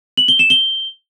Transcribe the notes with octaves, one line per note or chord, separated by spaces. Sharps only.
F#7
G7
E7
G7